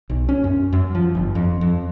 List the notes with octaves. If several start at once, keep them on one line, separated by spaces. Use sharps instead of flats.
B1
C#4
F#2
F#2
F3
G1
F2
F2